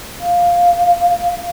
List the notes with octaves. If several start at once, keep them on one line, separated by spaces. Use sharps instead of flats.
F5